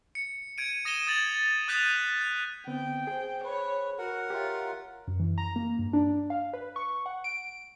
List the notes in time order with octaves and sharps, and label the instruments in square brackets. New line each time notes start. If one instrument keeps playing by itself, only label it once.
[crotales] C#7
G#6 D7 D#7
D#6 A#6 D#7 E7 G7
D#6 G#6 A6 F#7
D#6 F#6 G6 B6 D#7 F7
F#6
[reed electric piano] D3 B3 C4 [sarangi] G5
[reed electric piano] G#4 C5
[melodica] B4 [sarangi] C#5
[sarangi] F#4 [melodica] A#4 F#5
[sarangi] F4 [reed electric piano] G4 C#5 E5
[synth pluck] F#2
E3
A#5
A#3
G2
D4
F5
B4
C#6
F#5
D7